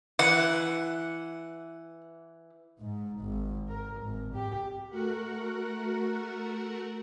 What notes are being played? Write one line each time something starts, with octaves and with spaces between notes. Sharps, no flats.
E3 F#5
G#2
G#1
A#4
G#1
G4
A3 F#4 A#4 F#5